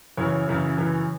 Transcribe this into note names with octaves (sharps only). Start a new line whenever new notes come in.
F#2 C#3 E3 C#5
F#2 C#3 E3
F#2 C#3 E3